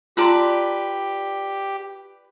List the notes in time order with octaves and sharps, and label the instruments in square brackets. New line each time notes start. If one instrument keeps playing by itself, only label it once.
[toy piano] F4 A#5 C6 [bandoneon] G4 [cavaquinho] B4 D5 A5